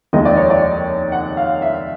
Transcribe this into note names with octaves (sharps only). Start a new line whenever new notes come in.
F1 D#2 D#3 G#3 D#5
D5
C#5
D5
F#5
F5
E5